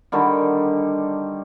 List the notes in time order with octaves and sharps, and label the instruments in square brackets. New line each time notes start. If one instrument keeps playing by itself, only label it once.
[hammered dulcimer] D3 D#3 G3